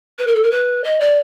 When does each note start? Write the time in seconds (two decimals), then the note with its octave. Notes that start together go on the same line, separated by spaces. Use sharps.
0.18 B4
0.27 A#4
0.35 A4
0.43 A#4
0.51 B4
0.83 D#5
1.00 D5